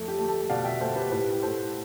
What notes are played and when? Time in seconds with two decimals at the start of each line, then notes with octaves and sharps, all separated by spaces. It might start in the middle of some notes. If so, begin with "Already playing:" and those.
Already playing: F2 A3 A4
0.08 G4
0.18 A3
0.29 A4
0.50 B2 D5 F5
0.65 E5 G5
0.81 A3 A4 C5
0.96 G4 B4
1.11 A2 G4 B4
1.43 A2 A4 C5